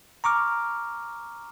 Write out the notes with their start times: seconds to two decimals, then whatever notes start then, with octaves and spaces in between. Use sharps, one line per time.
0.24 A#5 C#6 D6 F6